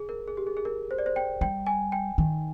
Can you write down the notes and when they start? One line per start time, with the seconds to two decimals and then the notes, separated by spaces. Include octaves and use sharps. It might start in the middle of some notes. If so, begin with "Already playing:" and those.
Already playing: G#4
0.09 A#4
0.28 G#4
0.37 G4
0.47 G#4
0.57 G#4
0.65 A#4
0.91 C5
0.98 D5
1.06 C5
1.16 G5
1.41 G3 G5
1.67 G#5
1.92 G5
2.18 D#3